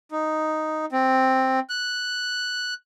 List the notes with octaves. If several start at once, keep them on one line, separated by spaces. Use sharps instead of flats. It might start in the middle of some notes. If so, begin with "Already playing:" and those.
D#4
C4
F#6